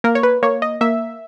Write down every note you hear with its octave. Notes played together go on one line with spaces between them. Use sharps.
A#3 A#4
C#5
B4
A#3 C#5
D#5
A#3 E5